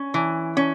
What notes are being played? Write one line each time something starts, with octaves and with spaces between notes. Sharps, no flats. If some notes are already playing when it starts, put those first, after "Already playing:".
Already playing: C#4
E3
C#4